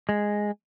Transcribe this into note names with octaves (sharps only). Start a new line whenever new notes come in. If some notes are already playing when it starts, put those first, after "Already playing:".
G#3